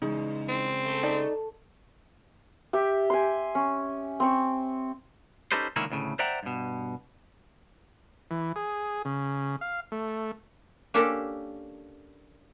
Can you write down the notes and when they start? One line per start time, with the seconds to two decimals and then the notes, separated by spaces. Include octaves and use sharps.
0.02 E2 C#3 G#3 D#4
0.48 C4
0.85 A3
1.03 D#4 D5 A5
2.73 G4 E5
3.10 G#5 C6
3.55 C#4
4.20 C4 C#6
5.52 C#4 D#4 G4 A4 B4 C5
5.76 C#2 D3 D#3 A#3 C#4 E4
5.90 D2 A2 C#3
6.19 C5 D5 E5 F#5 G5 A#5
6.43 G2 B2
8.31 E3
8.56 G#4
9.05 C#3
9.61 F5
9.92 A3
10.94 A#3 C#4 D4 G4 A4 A#4